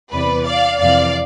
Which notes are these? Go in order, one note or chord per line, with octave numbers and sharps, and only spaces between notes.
E2 C3 E3 B4 D5
D5 F5
F2 C3 E3 D5 F5